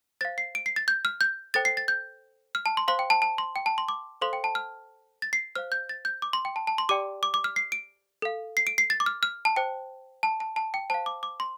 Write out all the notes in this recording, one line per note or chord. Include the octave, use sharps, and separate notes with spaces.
C5 F5 A6
C7
D7
C7
A6
G6
F6
G6
A4 C5 G5 A6
C7
A6
G6
F6
A5
C6
C5 F5 C6
G5
A5
A5
C6
G5
A5
C6
D6
A4 C5 F5 C6
G5
A5
F6
A6
C7
C5 F5 F6
G6
A6
G6
D6
C6
G5
A5
A5
C6
G4 D5 G5 D6
D6
D6
F6
C7
D7
A4 F5
C7
D7
C7
A6
D6
F6
F6
A5
C5 G5
A5
A5
A5
G5
C5 F5 A5
D6
D6
C6